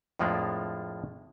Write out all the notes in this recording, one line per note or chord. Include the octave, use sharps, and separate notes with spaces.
F2 A2 F3 G#3 A#3 D4